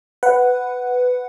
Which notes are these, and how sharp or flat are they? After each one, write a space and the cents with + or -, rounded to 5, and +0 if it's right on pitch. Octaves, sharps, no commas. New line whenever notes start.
B4 +10 F#5 +0